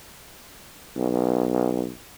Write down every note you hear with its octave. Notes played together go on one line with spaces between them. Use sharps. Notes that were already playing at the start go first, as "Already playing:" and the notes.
B1